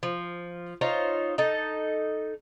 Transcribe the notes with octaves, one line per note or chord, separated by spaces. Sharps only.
F3
D#4 F4 C5 C#5
D#4 A4